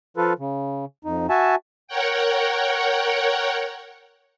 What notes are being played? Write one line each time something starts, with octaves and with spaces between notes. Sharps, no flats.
F3 F4 A4 B4
C#3
F2 D#4
F#4 E5 G#5 A5
A#4 C#5 F#5 G5